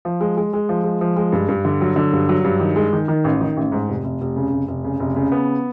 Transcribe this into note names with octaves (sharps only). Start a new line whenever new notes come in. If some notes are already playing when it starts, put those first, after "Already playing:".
F3
G#3
G#3
G#3
F3
G#3
F3
G#3
G2
G2
D3
F#3
D3
G2
F#3
G2
D#3
G#3
D#3
D#3
A1
D#3
A1
G#2
F1
F1
F1
C#3
F1
F1
C#3
F1
C#3
B3